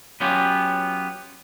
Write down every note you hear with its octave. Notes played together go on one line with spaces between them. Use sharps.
F#3 B3 C#4 F4 G4